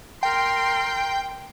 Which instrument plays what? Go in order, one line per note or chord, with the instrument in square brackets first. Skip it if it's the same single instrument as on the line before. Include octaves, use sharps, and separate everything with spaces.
[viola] A#4 C6 [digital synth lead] G5